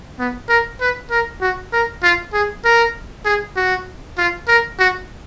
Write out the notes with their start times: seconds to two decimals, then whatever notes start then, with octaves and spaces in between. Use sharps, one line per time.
0.19 B3
0.49 A#4
0.81 B4
1.11 A#4
1.41 F#4
1.73 A#4
2.03 F4
2.33 G#4
2.65 A#4
3.25 G#4
3.56 F#4
4.18 F4
4.48 A#4
4.79 F#4